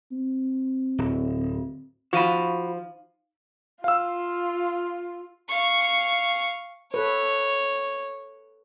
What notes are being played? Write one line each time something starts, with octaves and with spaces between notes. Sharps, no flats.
C4
D1
F3 D#4 F#4 F5 B5 D#7
F4 F5 E6
F5 C#6
A4 B4 C#5